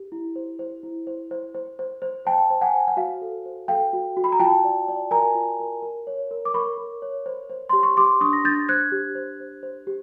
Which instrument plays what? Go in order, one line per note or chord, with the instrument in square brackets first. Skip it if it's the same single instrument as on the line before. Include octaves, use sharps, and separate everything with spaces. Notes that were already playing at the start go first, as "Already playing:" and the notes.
Already playing: [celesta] G4
E4
C5
C5
E4
C5
C5
C5
C5
C5
C5 G5 A5
C5
F#5 G#5
C5
F#5
F#4 F5
A4
C5
A4 F5 G5
F#4
F#4
B5
A#5
F4 G5 A5
D5
D5
A#4 G#5 A#5
F4
A#4
A#4
C#5
A#4
D6
A#4 B5 C#6
A#4
C#5
C5
C5
G4 C6
C#6
G4 C6 D6
D4 C#6 D#6
A#6
D4 G6 A6
C5 F#6 G#6
G4
C5
C5
C5
G4